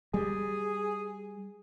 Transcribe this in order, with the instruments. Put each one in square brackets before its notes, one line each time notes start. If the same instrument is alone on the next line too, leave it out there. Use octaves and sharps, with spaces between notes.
[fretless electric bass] G3 [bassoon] G#4